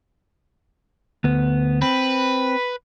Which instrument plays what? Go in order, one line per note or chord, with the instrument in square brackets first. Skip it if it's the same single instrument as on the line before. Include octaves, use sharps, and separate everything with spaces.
[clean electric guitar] D2 B3
[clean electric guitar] C4 [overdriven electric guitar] B4